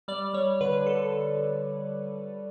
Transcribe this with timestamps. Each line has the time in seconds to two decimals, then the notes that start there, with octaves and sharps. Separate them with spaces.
0.08 G3 D5
0.33 G3 C#5
0.61 D3 B4
0.86 D3 A4